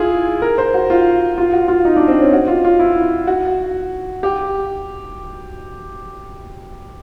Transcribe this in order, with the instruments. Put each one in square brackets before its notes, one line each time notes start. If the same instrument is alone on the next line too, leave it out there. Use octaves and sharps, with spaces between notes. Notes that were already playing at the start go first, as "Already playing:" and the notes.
Already playing: [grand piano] E4 F4 G#4
A#4
C5
F#4
F4
F4
F#4
F4
D#4
D4
C4
C#4
F#4
F4
F4
E4
F#4
G4